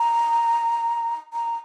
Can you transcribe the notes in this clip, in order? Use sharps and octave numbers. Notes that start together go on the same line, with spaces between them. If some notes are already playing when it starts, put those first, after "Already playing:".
Already playing: A#5
A#5